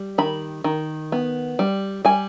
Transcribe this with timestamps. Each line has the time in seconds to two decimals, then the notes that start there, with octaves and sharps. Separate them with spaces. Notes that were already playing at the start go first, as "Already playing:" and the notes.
Already playing: G3
0.18 D#3 B5
0.64 D#3
1.12 B3
1.59 G3
2.05 G3 G#5